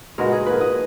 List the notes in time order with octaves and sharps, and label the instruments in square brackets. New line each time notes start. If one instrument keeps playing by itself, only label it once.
[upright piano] A#2 G#3 D#4 F#4 B4 [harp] A#4
[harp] G#4
[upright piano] G#2 F3 A#3 [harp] B4
[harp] D#5